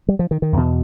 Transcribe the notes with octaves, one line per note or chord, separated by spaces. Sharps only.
G3
F3
D#3
D#3
E2 B2